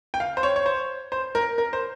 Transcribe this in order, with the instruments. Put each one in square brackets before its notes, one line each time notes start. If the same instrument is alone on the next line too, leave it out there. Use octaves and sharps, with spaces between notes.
[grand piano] G5
F5
C5
C#5
C#5
C5
C5
A#4
A#4
C5